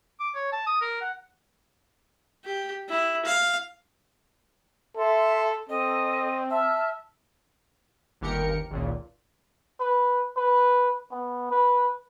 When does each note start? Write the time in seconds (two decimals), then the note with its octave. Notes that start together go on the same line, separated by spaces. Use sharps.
0.20 D6
0.35 C#5
0.52 A5
0.67 D#6
0.81 A#4
1.01 F#5
2.45 G4
2.89 E4
3.26 F5
4.96 A4 E5 C6
5.69 C4 A4 D#5
6.50 E5 A5 E6 F6
8.21 G1 D#2 G4 A#4 C#7
8.71 G#1 C#2 A#2
9.80 B4
10.37 B4
11.11 B3
11.51 B4